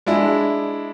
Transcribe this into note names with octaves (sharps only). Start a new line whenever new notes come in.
G#3 D4 E4